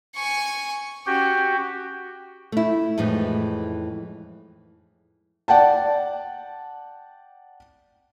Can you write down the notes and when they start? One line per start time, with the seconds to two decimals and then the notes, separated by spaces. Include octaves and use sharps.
0.16 G#5 C#6
1.06 C#4 F#4 G4 G5
2.52 A3 E4
2.98 F2 A2 E3 G#3 D#4
5.48 D5 F#5 G5 A5